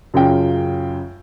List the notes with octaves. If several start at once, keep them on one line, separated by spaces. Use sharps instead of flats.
F#2 C#3 F4 G5